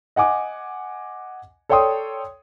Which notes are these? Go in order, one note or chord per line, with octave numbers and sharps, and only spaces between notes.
D#5 F#5 G#5 D6
A4 C#5 D5 G5 C6 D#6